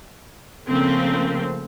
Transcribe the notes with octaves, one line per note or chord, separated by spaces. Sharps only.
C#3 F3 A3 A#3 C4